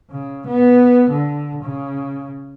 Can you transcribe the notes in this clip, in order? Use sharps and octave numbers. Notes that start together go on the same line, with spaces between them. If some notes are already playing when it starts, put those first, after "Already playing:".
C#3
B3
D3
C#3